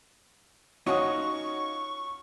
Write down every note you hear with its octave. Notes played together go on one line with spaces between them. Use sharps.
C#4 D#4 F4 F#4 F#5 C#6 D#6